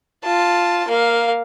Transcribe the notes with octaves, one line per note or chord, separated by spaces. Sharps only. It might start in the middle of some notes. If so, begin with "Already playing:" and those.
F4 A5
A#3 F5